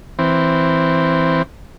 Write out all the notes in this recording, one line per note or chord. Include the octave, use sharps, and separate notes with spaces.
E3 C4